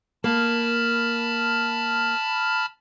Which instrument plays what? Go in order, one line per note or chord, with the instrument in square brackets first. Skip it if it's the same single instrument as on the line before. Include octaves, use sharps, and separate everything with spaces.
[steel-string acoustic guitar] A#3 [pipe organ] A5 B5 F6